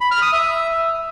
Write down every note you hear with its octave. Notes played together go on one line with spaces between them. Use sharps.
B5
F6
D#6
E5